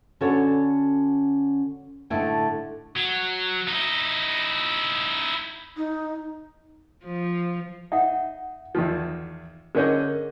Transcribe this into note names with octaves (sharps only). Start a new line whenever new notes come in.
D3 C#4 F#4 A4 C#5
A2 D3 A3 D#4 E4 G5
F#3
D#4 E4
D#4
F3
D#4 E5 F#5
E2 D#3 F3
D3 C#4 G#4 A#4 C#5 D#5